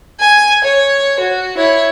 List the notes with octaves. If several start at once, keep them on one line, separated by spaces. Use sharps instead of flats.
G#5
C#5
F#4
E4 C#5